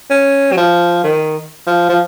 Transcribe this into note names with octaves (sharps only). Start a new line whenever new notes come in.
C#4
F#3
F3
D#3
F3
F3